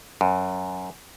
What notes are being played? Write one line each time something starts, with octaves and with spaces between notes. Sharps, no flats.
F#2